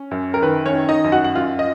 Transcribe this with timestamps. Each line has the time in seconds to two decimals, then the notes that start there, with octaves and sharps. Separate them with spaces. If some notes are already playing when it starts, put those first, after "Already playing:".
Already playing: C#4
0.11 F#2
0.34 A#4
0.42 D#3 B4
0.66 C#4 C#5
0.73 D#3
0.89 D#4 D#5
1.04 F#2
1.12 F#4 F#5
1.24 F#5
1.35 F#2 F4 F5
1.59 D#5